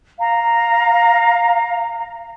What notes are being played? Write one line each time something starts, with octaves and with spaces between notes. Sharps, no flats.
F5 A#5